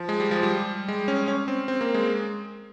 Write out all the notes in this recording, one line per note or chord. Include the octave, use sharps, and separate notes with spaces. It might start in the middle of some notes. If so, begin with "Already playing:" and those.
Already playing: F3
G#3
G3
F3
G3
G#3
C#4
C#4
C4
C4
A#3
G#3